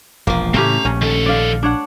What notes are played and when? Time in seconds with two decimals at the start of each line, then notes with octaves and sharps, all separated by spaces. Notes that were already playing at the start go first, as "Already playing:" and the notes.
0.27 E1 A#1 F3 A#3
0.54 A2 C#3 E3 A3 C4 C#4 G4 A#5
0.85 A#1 C#4
1.02 D#3 A4
1.26 D5 F5
1.63 D4 C#5 F#5